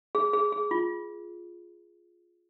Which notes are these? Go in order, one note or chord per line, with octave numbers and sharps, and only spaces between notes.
G#4
G#4
G#4
F4